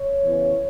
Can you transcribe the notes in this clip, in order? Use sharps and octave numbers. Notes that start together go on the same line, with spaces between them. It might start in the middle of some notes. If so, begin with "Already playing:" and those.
Already playing: C#5
E2 C#3 E3